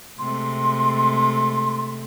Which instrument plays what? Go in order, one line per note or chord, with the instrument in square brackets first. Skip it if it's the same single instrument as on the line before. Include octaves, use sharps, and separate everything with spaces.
[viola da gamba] C3 G#3 A3 [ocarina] C6